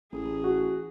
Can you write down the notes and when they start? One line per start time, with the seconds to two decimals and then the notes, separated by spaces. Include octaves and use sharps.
0.12 A1 G#4
0.44 F#4